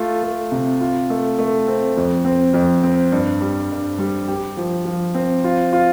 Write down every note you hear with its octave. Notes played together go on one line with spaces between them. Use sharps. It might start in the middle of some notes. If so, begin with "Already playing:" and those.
Already playing: A3 F4
A3
C3
F4
A3
A3
C4
F2
C4
F2
C4
G2
G3
G2
G3
G4
F3
F3
C4
F4
F4